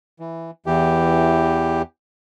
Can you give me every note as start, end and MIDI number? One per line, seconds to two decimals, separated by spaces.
0.20 0.51 52
0.66 1.82 40
0.66 1.82 52
0.66 1.82 67